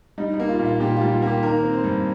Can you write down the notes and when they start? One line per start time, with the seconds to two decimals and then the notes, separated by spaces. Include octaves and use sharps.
0.18 G3 D#4
0.34 D#4
0.40 A#3
0.49 F4
0.59 A#2
0.65 F4
0.80 A#2 G4
0.97 F4
1.01 G3
1.11 F4
1.22 A#3
1.27 G4
1.43 D#3 A#4
1.63 C4
1.73 C5
1.84 G2